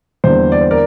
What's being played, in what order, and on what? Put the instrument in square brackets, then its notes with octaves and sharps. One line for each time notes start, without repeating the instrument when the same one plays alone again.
[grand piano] E2 D3 G3 A#3 C5
D5
C5
A#4 D5